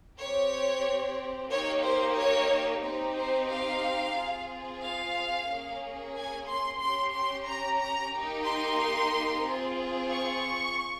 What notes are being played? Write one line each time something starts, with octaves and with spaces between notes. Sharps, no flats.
C4 G4 C#5
A#3 D#4 G4 C#5
C5
C#5
C4 D#4 G4
C5
F5
C4 F4 G#4
F5
A#3 C#4 G#4
G#5
C6
C#4 G4 C6
C6
A#5
A#5
A#3 D#4 G4
C6
C4 F4 G#4
C#6